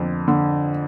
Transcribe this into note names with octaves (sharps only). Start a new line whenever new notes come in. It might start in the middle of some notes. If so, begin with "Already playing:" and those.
Already playing: F2 D3
D3